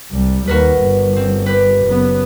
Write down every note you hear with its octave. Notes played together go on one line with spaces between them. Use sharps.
C2 G3
D#2 F#4 A#4 B4
G1
C4
G4 B4
F#1 B3